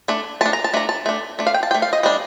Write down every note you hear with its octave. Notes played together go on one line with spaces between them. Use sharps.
A3 D4
A3 D4 A5
A#5
A5
A3 D4 A#5
A5
A3 D4
A3 D4
F5
G5
A5
A3 D4 G5
F5
D#5
G3 D4 D#5